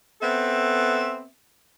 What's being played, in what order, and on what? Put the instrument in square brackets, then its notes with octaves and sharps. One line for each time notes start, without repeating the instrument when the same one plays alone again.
[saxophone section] B3 C4 A4 E5